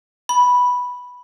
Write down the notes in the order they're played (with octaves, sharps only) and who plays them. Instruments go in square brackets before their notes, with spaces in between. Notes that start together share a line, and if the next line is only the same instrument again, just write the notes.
[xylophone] B5